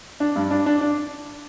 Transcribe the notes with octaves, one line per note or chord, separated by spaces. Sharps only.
D4
G2
D4
D4
D4